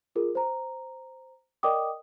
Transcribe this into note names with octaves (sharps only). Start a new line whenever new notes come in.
F4 G#4 A#4
C5 A#5
A#4 D5 D#5 G5 D6 D#6